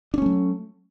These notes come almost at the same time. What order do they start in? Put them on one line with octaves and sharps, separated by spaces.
D4 C#4 A3 F#3